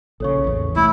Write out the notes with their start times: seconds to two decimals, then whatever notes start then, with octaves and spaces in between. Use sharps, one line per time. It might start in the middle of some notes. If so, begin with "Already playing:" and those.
0.20 A#1 C#3 A4 C#5 C#6
0.44 A1 E2
0.76 C2 A3 E4